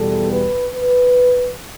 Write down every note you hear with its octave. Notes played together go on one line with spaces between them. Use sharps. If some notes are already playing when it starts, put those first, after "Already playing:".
Already playing: E2 B2 G3 A4
B4
B4